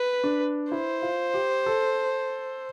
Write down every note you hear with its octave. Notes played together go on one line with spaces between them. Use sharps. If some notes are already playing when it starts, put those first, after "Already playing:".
Already playing: B4
D4
E4 C5
F4
G4
A4